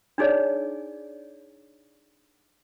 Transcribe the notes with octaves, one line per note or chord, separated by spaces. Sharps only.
D4 D#4 G#4 C#5 D5